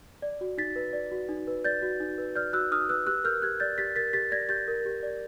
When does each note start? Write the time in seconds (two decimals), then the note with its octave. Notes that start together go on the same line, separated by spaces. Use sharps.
0.22 D5
0.41 F#4
0.58 D#4 A6 B6
0.76 B4
0.93 D5
1.11 F#4
1.29 D#4
1.47 B4
1.64 D5 G6 A6
1.82 F#4
2.00 D#4
2.18 B4
2.36 D5 F6 G6
2.53 F#4 E6 F#6
2.71 D#4 D#6 F6
2.89 B4 E6 F#6
3.06 G4 E6 F#6
3.24 A#4 F6 G6
3.42 G4 F#6 G#6
3.60 D5 G6 A6
3.78 G4 A6 B6
3.96 A#4 A6 B6
4.13 G4 A6 B6
4.32 D5 G#6 A#6
4.49 G4 G6 A6
4.68 A#4
4.85 G4
5.03 D5